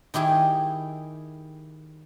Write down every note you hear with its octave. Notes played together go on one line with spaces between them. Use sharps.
D#3 E4 G4 G#4